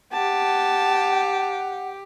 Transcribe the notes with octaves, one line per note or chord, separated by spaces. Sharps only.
G4 F#5 A5